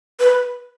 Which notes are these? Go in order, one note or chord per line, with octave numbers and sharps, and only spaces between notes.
B4